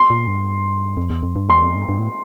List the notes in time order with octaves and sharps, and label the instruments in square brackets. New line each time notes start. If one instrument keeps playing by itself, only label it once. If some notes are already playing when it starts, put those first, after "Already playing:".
Already playing: [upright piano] C6
[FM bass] A#2
G2
F2
E2
F2
G2
[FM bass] E2 [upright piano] C6
[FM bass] F2
G2
G2
A2